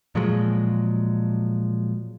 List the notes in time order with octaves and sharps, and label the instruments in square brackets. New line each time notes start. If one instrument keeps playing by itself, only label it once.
[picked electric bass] A#2 F3 F#3 G#3